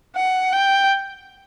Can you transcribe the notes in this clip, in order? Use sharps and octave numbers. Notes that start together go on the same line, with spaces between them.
F#5
G5